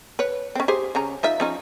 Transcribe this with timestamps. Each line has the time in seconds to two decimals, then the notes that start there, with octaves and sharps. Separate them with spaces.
0.19 B4 C#5
0.55 C4 C#4
0.68 G4 G#4 C5
0.95 C#3 C#4 A#5
1.23 D#4 F4 E5
1.40 F3 C#4 D#4